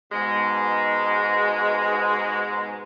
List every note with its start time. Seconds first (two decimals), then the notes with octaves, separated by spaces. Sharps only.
0.12 G#2 B2 G#3